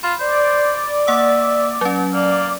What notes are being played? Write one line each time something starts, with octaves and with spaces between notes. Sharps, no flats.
F4 B5
C5 D5
A#3 E5 F#5 D#6
F#3 C#4
A#3 D5